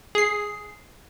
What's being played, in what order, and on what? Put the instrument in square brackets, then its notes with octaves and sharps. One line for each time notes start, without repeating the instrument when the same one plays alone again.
[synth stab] G#4 C7